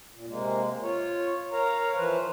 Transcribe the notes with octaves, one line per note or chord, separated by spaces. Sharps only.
A#2
C3 G#3 A#3
F4 C#5
A#4 C#5 F5 A#5
E3 F3 B4 C5